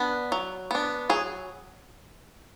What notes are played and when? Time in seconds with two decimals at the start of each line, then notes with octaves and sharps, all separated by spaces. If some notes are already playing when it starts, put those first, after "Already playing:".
Already playing: B3 D4
0.32 F#3
0.71 B3 D4
1.09 F#3 G#4